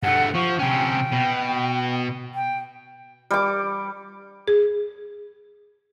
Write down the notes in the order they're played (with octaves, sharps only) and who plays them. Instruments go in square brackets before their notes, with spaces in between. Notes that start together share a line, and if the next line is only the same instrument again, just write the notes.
[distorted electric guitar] G2 A3 [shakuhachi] F#5
[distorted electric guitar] F3 [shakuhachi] C#6
[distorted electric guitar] C3 C#4 [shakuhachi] G5
[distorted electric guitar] B2
[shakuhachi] G5
[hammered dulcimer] G3 D6
[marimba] G#4